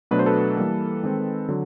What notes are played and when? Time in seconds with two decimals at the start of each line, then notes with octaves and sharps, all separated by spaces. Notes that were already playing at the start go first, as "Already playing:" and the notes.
0.11 B2 F#3 A3 D4 B4
0.19 C5
0.26 A4 B4
0.57 E3 G3 A#3
1.03 D#3 G#3 C4
1.49 D3 F#3